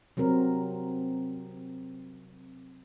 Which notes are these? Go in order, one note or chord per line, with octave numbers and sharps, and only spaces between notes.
C3 F#3 C4 A#4